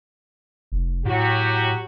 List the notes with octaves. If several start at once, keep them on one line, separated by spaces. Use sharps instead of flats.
F1
A2 F#3 F#4 G4